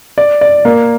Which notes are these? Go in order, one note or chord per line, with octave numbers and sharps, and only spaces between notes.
D5
D5
A#3